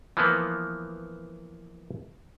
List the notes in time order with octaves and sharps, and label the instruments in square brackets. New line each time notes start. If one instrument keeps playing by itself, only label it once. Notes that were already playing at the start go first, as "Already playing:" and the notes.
[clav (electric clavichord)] E3 F3 A#3 B3